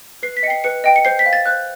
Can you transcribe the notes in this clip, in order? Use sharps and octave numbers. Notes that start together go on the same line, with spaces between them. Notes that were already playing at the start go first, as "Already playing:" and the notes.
B4 C7
B6
D#5 G5 C7 C#7
B4 C#7
D#5 G5
C#7
C5 C7
B6
F5
A6
C5 F#6